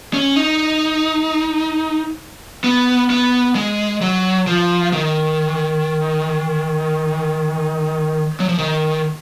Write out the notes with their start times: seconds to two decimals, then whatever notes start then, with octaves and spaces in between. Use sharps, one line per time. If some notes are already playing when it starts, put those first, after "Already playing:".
0.14 C#4
0.36 D#4
2.64 B3
3.10 B3
3.55 G#3
4.02 F#3
4.47 F3
4.92 D#3
8.40 F#3
8.49 F3
8.58 D#3